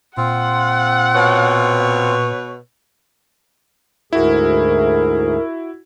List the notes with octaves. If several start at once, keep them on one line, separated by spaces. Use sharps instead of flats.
A#2 C4 F4 F#5
B2 B4 C#5
D2 G#2 E4 F#4 G#4 A#4